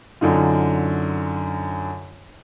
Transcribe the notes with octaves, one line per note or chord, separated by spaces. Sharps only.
F#2 D3 D#4 F4